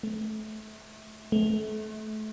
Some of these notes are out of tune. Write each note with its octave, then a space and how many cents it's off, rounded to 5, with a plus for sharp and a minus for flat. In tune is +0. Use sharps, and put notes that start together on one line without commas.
A3 -30
A3 -35